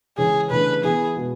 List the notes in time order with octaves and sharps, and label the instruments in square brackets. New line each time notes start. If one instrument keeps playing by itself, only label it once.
[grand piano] C#3 E3 G#3 C#4 [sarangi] G#4
[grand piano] C#3 E3 A3 D4 [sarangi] B4
[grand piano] E3 B3 E4 [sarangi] G#4
[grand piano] B2 G#3 B3